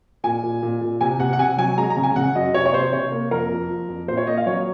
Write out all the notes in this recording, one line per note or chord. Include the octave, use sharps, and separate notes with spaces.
A#2 G#5
A#2
A#2
A#2
C3 G#5
C3 F#5
F#5
C3 G#5
F#3 G#5
G#3 A#5
A#5
C#3
G#5
C#3 F#5
F#2 D#5
C3 C#5
C#5
C3 C5
C3 C#5
A#3
F2 A#4
F2
F3
F2
A#2 C5
C#5
A#3 D#5
F5
F#3 C#5